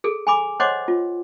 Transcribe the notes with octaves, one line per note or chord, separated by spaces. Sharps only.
G#4 A4
G#5 B5 D6
C5 C#5 D#5 F#5 C6 D6
F4